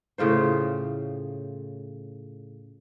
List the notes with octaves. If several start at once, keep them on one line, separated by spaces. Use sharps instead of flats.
A2 C#3 F4 C5